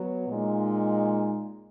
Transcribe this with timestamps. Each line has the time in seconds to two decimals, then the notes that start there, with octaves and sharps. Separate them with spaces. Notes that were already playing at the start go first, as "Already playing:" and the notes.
Already playing: F#3 B3 F#4
0.27 A#2 G#3 D#4